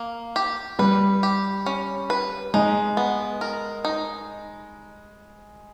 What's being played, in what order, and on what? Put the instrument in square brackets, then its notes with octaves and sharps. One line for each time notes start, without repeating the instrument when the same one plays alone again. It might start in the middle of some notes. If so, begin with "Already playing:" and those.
Already playing: [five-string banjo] A#3
G4
[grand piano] G3 [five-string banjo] B4
[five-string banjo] G4
C#4
B4
[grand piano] G#3 [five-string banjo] D#4
[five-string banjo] B3
A#4
D#4